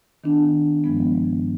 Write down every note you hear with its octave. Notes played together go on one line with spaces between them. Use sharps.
D#3 B3 D4
G2 F3 G#3 B3